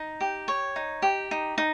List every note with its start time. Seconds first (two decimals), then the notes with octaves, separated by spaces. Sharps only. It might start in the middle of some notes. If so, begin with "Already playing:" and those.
Already playing: D#4
0.21 G4
0.48 C#5
0.76 D#4
1.02 G4
1.31 D#4
1.58 D#4